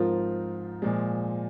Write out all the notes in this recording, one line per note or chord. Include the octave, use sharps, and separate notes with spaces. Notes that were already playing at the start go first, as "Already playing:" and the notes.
Already playing: G#2 F3 C4 F4 A#4
A#2 F3 G#3